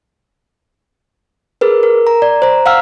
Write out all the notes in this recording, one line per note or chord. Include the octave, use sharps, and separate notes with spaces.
G#4 A#4 B4
A#4
A#5
D5
C5 A#5
F5 F#5 E6 F6